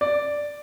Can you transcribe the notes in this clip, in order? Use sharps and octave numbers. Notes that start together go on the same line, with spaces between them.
D5